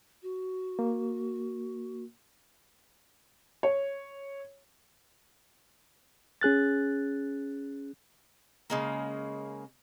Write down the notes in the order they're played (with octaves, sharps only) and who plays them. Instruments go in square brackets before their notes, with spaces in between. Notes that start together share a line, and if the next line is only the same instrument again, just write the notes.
[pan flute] F#4
[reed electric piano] A#3
[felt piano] C#5
[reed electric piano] C#4 G#4 F#6 A6
[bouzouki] C#3 G#3 A#3